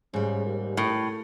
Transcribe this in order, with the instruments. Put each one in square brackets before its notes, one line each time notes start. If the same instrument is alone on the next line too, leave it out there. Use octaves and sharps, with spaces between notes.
[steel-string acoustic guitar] G#2 G3 [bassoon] C#3
[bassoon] D#2
[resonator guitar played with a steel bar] A2